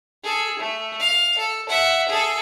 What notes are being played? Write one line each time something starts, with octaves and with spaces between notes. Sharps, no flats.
G#4 A4
A3
F5
A4
E5 F#5
G#4 A4